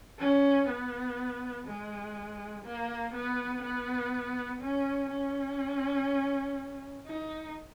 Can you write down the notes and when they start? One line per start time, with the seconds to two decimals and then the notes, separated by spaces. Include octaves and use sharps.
0.19 C#4
0.68 B3
1.67 G#3
2.65 A#3
3.14 B3
3.63 B3
4.61 C#4
5.10 C#4
7.06 D#4